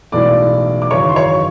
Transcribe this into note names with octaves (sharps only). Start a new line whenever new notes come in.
B1 A2 E3 G#3 D5 D6
D6
G#1 F#2 C#3 E3 C#5 C#6
C6
C#5 C#6